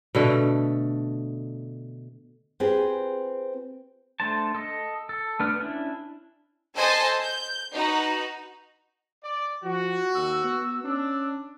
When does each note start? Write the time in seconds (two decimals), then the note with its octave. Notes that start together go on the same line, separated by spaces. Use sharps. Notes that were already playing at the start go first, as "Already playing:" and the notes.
0.15 B2 D3 A3
2.60 C4 F4 G4 G#4 B4 C5
4.20 A3 D4 C5 A5
4.55 A4 D#5
5.09 A4
5.40 A3 B3 D4 B4 F6
5.59 C#4 D4 E4
6.75 A4 C5 D#5 G#5 A5
7.21 G6
7.74 D#4 F#4 B4
9.24 D5
9.64 F3 F#4
10.15 D#2 E6
10.44 B3
10.84 C#4 D4